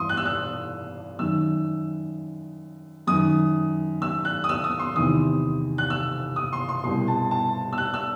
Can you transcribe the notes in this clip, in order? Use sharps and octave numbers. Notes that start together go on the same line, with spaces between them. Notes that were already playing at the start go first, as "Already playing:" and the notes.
Already playing: G2 E3 C6 D#6
F#6
E6
F#6
F#2 D#3 E6
F#2 D#3 D#6
E6
F#6
D#6
E6
D#6
C6
E2 C3 D#3 D#6
F#6
E6
D#6
C6
C6
C2 B2 C6
A5
A5
E6
F#6
E6